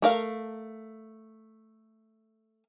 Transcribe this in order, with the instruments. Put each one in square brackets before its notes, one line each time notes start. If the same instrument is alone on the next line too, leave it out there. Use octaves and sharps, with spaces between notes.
[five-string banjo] A3 A#4 F5